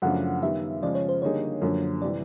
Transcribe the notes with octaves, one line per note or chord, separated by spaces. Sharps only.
F#2 C#3 F3 A3 D4 F#5
D#3 G3 B3 E5
C#3 F3 G#3 D5
C#5
C5
D3 G3 A#3 D#4 G#4 C#5
F#2 D3 F3 A#3
C3 E3 G3 D5